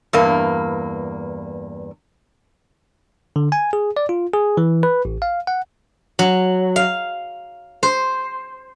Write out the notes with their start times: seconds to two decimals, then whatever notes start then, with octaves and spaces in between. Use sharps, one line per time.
0.13 E2 G2 A#3
3.36 D3
3.52 G#5
3.73 G#4
3.97 D5
4.09 F4
4.33 G#4
4.57 E3
4.83 B4
5.05 A1
5.22 F5
5.47 F#5
6.19 F#3
6.76 F5
7.83 C5